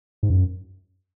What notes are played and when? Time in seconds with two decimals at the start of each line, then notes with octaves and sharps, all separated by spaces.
0.23 G#2
0.30 F#2